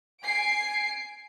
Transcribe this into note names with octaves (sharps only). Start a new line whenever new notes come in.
G#5 C7 D7